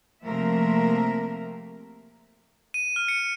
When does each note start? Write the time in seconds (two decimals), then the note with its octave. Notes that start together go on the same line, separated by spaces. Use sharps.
0.23 C3 F3 A3 A#3 A#4 E5
2.74 D#7
2.96 F6
3.08 C#7